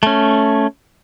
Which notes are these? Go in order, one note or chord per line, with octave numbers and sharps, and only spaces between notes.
A3 C#4